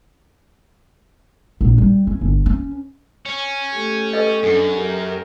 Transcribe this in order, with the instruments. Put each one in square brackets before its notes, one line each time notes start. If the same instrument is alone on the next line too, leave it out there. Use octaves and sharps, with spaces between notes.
[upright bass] A#1
G3
C#4
G1
C#4
[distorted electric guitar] C#4
[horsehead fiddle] A3 G4
[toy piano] A4 B4 D#5
[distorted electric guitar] F#2 [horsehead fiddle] C#4 D4 [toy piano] A4 C#6
[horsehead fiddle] G4 A#4